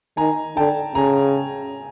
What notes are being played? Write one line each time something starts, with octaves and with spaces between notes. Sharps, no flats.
D#3 G#5 A#5
D3 G5 A5
C#3 G#5 A#5